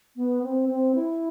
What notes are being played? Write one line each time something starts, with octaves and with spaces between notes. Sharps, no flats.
B3
C4
C4
E4